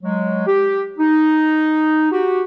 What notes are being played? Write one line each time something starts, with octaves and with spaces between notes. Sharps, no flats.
F#3 G#3
G4
D#4
F#4 G4